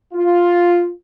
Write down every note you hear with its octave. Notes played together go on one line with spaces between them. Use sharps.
F4